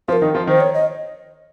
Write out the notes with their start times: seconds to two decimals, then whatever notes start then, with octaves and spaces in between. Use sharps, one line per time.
0.08 F3 F4 C5
0.13 A#4
0.22 D#3 D#4
0.35 F3 F4
0.47 D#3 D#4 C5
0.60 C#5
0.74 D#5